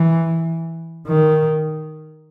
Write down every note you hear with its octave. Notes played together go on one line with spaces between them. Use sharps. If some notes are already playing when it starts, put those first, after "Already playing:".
Already playing: E3
D#3